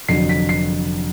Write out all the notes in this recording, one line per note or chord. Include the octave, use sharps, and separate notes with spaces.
F1 F2 D3 F#3 C7
B6
C7